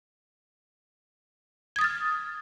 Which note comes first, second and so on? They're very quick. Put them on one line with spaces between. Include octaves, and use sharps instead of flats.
G#6 D#6 A6 F6